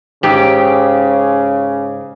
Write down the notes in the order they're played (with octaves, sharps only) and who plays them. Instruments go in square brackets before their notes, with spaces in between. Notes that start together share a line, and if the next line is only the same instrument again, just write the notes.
[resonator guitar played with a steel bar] G#2 G4 [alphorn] C#3